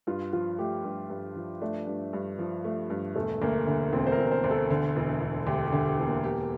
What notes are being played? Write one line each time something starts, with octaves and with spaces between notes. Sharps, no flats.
G2 F4
F3 F4
A3 G4
G2
G2
F3
A3 D4
G2
G2
F3
A3
G2
E1 A3
D2 A#3
D3
E1 C4
C5
A#4
E1
A#4
C5
D2
A4
D3
E1
E1
D2 G4
G4
D3
G4
E1
A#3
G4